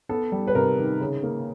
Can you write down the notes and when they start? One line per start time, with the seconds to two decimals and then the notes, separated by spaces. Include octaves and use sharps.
0.09 B3 A4
0.32 G3
0.47 B4
0.55 C3 A#4
0.78 D#3
1.00 C#3
1.23 A#3